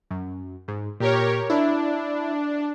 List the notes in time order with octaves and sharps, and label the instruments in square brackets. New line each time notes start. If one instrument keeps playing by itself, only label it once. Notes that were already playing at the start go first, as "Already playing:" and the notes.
[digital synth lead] F#2
G#2
[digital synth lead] A#2 [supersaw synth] G4 A#4 C#5
[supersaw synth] D4 [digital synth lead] E4